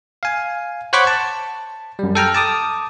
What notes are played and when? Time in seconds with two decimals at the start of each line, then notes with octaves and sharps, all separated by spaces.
0.23 F5 G#5
0.93 C5 C#5 F#5 B5 C#6 D6
1.07 A5
1.99 F#2 G3
2.15 A4 G5 A#5 F6
2.34 A5 D6 D#6